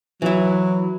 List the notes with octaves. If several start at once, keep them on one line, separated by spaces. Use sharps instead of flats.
E3 F#3 E4